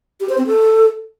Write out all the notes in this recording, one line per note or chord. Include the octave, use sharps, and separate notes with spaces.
G4
C5
C4
A4